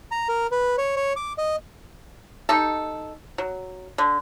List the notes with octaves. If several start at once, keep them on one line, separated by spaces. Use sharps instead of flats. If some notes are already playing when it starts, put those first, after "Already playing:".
A#5
A#4
B4
C#5
C#5
D6
D#5
D#4 G4 A4
F#3
D3